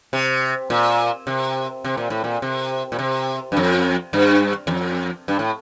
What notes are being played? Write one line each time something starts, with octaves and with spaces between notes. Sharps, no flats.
C3
A#2
C3
C3
A#2
A2
A#2
C3
A#2
C3
G2
F2
G2
E2
F2
G2
A2